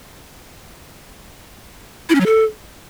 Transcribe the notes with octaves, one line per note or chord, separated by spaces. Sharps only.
E4
C#4
F#3
A4